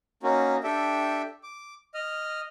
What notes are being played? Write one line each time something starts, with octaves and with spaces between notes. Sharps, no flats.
A#3 C#4 D#4 F#4
D4 G4 A4 E5 G5
D6
D#5 F6